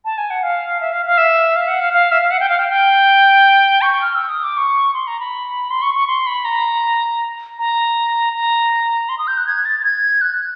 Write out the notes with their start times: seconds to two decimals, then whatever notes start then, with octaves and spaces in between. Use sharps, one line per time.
0.05 A5
0.18 G#5
0.30 F#5
0.43 F5
0.81 E5
0.92 F5
1.06 F5
1.18 E5
1.56 F5
1.68 F#5
1.80 F5
1.93 F5
2.12 E5
2.21 F5
2.31 F#5
2.40 G5
2.49 F5
2.59 G5
2.69 G5
3.82 C#6
4.02 F6
4.15 E6
4.29 D#6
4.43 D6
4.57 C#6
4.94 C6
5.07 A#5
5.20 B5
5.70 C6
5.82 C#6
5.94 C#6
6.07 C6
6.26 B5
6.45 A#5
7.59 A#5
8.33 A#5
9.09 C6
9.18 D#6
9.27 G6
9.37 F#6
9.47 G#6
9.65 A6
9.79 A6
9.84 G#6
10.21 F#6